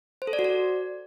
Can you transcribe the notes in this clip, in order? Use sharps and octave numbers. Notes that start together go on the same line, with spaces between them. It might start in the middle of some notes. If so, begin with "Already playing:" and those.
C5
A4
D5
F#4
D5